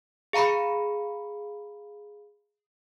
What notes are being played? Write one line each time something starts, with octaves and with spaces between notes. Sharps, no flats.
G#4 F5 A#5 B5 C#7